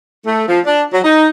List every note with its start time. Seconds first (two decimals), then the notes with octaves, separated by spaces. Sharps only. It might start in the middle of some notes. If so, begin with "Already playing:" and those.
0.24 A3
0.48 F3
0.65 D4
0.93 F#3
1.04 D#4